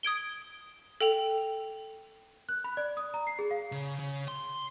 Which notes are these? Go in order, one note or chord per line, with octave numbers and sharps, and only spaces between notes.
D#6 G#6 D7 G7
A4 G5 F7
F#6
B5
D5
D#6
A#5
C7
G#4
F5
C#3
C#3
C6